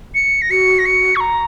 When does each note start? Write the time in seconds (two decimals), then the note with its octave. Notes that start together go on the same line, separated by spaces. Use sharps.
0.15 C#7
0.42 A#6
0.50 F#4 C#7
0.79 A#6
0.86 C#7
1.16 C#6
1.20 A#5